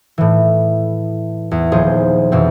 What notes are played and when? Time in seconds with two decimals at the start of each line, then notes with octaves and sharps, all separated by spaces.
0.18 A2 E3
1.51 E2
1.72 D#1 F3 G#4 C5
2.32 F2 B2 E3 C4